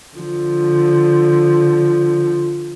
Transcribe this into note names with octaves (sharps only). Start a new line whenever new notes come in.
D3 F3